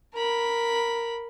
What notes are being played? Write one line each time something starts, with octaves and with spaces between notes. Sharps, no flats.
A#4 B5